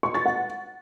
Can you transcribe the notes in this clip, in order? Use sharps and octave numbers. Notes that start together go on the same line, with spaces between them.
C#6
A6
F#5